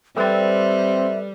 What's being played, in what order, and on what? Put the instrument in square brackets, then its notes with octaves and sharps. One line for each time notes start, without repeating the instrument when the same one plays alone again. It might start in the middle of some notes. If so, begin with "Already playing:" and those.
[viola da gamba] G3 [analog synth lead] C4 [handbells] A4 B4 D5 [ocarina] E5